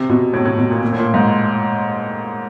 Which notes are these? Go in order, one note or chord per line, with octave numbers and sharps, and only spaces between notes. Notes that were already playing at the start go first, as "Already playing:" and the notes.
Already playing: C3
B2
A2
A2
B2
A#2
A#2
A2
A#2
G#2